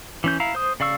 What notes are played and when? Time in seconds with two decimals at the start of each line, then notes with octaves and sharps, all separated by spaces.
0.24 E3 C#4 G6
0.40 E4 F5 A#5
0.55 C5 D#6
0.80 C#3 D5 F5 C#6 E6